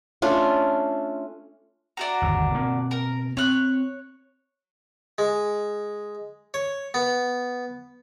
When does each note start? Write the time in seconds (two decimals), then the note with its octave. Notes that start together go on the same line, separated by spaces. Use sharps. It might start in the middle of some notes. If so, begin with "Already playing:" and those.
0.22 A3 C#4 D4 F4
1.97 D4 F#4 A#5
2.22 G1 D#2 G#2
2.54 B2 A#3 C4
2.91 A#4
3.37 C4 C#5 F#6
5.18 G#3
6.54 C#5
6.94 B3